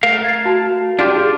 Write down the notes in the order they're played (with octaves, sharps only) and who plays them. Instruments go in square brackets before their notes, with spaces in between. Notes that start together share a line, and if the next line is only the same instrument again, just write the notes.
[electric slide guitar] A3 A#4 F5
[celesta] G#6 A6 C7
F#4 A5
[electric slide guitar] D4 F4 G4 [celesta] D5 C6 D6
[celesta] G#4